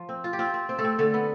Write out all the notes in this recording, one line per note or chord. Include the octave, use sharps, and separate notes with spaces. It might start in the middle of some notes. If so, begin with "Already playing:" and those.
Already playing: F3
C4
F4
G4
C4 F4
C4
C4
A3 A4
C4
D3 A3 A4
B3